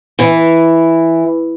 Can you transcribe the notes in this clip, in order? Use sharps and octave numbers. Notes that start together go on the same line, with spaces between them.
E3